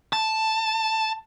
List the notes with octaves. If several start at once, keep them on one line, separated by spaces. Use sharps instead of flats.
A5